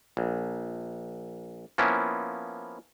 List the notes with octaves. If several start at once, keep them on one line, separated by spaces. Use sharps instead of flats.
A#1
F3 A#3 B3 C#4 E4